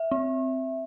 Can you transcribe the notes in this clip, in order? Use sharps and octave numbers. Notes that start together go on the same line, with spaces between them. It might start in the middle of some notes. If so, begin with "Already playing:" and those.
Already playing: E5
C4